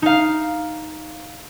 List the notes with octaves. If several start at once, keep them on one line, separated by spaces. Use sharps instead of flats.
D#4 F5